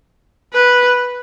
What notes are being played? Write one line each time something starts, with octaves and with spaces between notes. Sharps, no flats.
B4